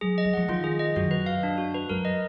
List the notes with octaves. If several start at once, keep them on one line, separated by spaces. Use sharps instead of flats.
F#3 G#4
D#5
F#3
F3 F#5
D#3 F4
G#4
D#5
F#2 F#4
B4
F5
D4
F#4
B4
F#2 A#4
D#5